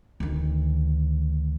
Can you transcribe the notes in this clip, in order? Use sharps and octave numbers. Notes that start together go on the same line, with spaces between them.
D2 D#3